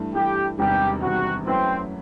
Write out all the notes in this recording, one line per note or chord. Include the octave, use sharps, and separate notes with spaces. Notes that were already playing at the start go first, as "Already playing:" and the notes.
Already playing: G2 E3 A3
G2 E3 A3 G4
E1 E2 C3 D#3 G3 G4
E1 E2 C3 D#3 G3 F#4
F#2 F#3 A3 C4 E4 B4